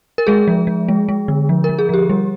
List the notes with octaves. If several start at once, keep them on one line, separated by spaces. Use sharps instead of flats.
A#4
G#3 G#4
F3
F3
G#3
G#3
D3
F3
A#4
F3
G#4
F3 G4
G3